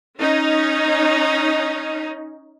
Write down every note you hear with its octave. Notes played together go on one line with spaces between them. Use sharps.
C#4 D#4